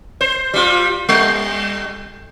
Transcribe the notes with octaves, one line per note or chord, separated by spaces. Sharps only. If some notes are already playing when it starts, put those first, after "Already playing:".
C5
G3 F4
G3